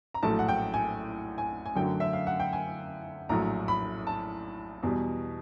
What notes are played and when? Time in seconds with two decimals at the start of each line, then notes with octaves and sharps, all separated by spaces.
0.14 A#5
0.23 A#1 A2 F#3 A3 A5
0.39 F#5
0.49 G5
0.74 G#5
1.38 G#5
1.66 G#5
1.76 F#2 D3 F#3 A3 G5
2.00 E5
2.13 F5
2.27 F#5
2.40 G5
2.53 G#5
3.29 A#1 A2 F#3 A#5
3.68 B5
4.07 A5
4.83 E2 B2 G3